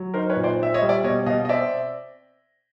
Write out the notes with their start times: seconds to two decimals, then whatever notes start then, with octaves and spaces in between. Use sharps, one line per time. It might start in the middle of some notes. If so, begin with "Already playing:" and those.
Already playing: F#3
0.14 D#4 A#4 C5
0.30 B4 C#5
0.37 A#2
0.44 C5 D5
0.60 C4 E5
0.74 C#5 D#5
0.82 G3
0.89 D5 E5
1.04 B2 C#5 D#5
1.26 B2 D#5 F5
1.45 D#5
1.49 C4 D5 E5